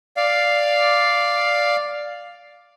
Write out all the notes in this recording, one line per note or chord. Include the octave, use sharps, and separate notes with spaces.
D5 F5